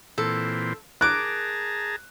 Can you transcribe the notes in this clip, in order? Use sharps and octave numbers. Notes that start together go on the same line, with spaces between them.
A#2 E3 C4 A4
G#4 A#4 A5 A#5 D6 F#6